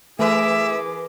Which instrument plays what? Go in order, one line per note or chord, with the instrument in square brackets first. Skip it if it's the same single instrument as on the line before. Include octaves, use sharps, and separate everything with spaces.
[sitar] E3 A#4 B4 [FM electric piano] A3 [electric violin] G#4 D6 [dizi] E5